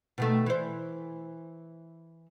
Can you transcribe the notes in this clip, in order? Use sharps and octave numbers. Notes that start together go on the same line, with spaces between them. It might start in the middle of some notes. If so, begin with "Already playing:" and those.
B2 D#3 A3
E3 C5